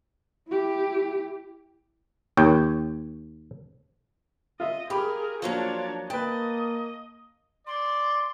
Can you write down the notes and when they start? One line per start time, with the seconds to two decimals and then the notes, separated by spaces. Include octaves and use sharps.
0.48 E4 G4
2.37 D#2 C#5 G5
4.60 F4 D#5 E5
4.90 F4 G4 G#4 A#4 B5 D6
5.42 F3 F#3 A#3 D4 F4 C#5
6.10 A#3 B4 D#5 G5 A5
7.67 D5 C6